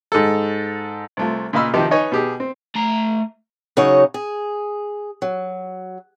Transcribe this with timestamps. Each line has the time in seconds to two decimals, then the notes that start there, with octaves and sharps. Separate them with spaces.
0.12 G#2 A4
1.17 C2 A3 F4
1.53 A#2 C#3 D#5 F5 B5 E6
1.74 C3 D#3 F3 D#4 G4
1.91 D#4 B4 C#5 D#5 G#5 C#6
2.12 B2 G4 G#4
2.40 C4
2.75 A3 A#5
3.77 C#3 F#3 D#4 F#4 C#5 D#5
4.14 G#4
5.22 F#3